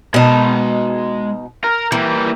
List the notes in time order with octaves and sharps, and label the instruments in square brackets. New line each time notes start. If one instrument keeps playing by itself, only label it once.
[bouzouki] B2 D#4 [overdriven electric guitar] G#3 A5
[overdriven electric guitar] A#4
[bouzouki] E3 [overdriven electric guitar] G3 A#3